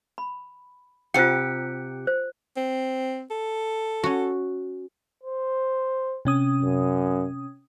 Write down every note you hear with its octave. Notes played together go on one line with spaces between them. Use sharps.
B5
C3 F4 G4 C5 F#5 F#6 C#7
C5
C4
A4
C#4 F#4
C5
C3 C#4 D#6
F#2